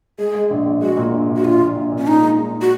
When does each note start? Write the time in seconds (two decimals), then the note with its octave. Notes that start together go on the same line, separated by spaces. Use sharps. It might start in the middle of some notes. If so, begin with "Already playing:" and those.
0.18 G#3 G#4
0.35 G#3
0.50 A#1
0.66 A#1
0.82 G#3 F#4
0.97 A#2
1.13 A#1
1.29 A#1
1.36 F#4
1.44 A#1 F4
1.61 A#1
1.76 A#1
1.92 A#2
1.98 C#4
2.07 A#2 D#4
2.22 G#3
2.38 G#3
2.61 F#4